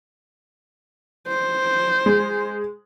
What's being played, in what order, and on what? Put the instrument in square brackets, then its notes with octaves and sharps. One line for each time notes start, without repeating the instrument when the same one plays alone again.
[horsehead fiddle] C5
[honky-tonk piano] G#3